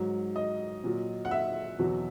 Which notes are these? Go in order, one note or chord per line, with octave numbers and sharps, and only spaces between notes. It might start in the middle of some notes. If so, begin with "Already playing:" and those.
Already playing: G#2 F#3
D#5
A#2 F#3
F#5
E5
E2 B2 F#3